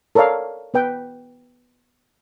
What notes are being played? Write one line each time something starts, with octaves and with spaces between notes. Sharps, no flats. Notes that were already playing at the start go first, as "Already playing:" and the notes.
A4 A#4 C#5 D5 F5
B3 B4 G5